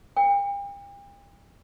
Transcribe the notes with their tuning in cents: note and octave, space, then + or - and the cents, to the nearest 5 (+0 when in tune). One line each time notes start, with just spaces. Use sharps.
G5 +40